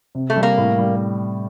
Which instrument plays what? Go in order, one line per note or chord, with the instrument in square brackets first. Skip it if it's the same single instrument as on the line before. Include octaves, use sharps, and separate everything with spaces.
[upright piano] C3
[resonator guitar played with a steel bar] A3
[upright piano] G3
[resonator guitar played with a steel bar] A#3
[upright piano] A2
G3